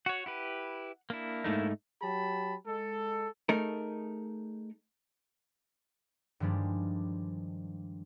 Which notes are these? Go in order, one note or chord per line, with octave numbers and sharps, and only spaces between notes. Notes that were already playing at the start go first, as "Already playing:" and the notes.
F#4 C#5 F#5
E4 G4 B4
A#3 D4 E4
G#2 A3 D#4
F#3 G4 A5 B5
G#3 A4
A3 D#4 G#4 A#4
G2 D#3 F3 G3 G#3 D4